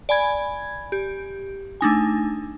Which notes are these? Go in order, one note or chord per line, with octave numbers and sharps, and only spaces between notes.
D5 G#5 B5 G#6
G4
A3 D4 D#4 G#5